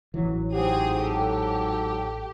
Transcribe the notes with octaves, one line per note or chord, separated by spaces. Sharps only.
A1 E3 F#3
G#2 F#3 C4 G4 G#4 D#6
G4 A4